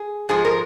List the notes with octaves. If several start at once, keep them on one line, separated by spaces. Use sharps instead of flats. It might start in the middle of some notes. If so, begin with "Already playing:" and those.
Already playing: G#4
G#2 F3 G#3 G#4
A#4